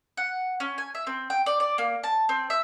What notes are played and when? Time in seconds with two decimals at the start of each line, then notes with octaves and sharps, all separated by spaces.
0.17 F#5
0.60 C#4
0.78 G#5
0.95 E5
1.07 C4
1.30 G5
1.46 D5
1.60 D5
1.78 A#3
2.03 A5
2.29 C4
2.50 E5